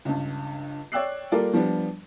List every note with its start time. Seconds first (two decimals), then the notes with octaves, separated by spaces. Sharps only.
0.05 C#2 G2
0.92 C#5 D5 G5 E6 F#6 C7
1.32 G3 A#3 F4 A4 A#4 D5
1.54 F3 G3 B3 D4